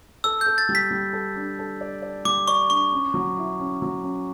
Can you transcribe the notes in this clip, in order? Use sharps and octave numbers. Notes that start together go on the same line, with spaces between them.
A4 E6
G6
A4
A6
G3
B6
G3
A4
D4
A4
D5
D5
G3 D6
D5 C#6
D4 C#6
C#4
F#3
E4
C#4
F#3
C#4